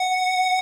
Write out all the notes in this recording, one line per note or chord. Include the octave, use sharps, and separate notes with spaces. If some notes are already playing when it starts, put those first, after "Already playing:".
Already playing: F#5